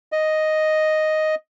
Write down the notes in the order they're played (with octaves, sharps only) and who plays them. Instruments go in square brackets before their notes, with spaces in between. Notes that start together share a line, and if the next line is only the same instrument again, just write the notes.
[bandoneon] D#5